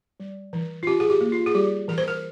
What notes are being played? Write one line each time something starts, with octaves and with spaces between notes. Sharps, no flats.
G3
E3
F4
C#4 G4
G#4
G4
A#3
F4
G#4
G3 G4
E3 A#4
C5
A#4